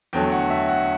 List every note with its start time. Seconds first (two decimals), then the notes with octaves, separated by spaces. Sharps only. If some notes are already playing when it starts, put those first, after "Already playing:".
0.13 E2 D3 F#3 A3 G5
0.32 F#5
0.50 E5
0.69 F#5